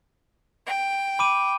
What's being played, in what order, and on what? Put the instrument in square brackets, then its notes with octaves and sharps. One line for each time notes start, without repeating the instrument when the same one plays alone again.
[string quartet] G5
[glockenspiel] B5 D6 D#7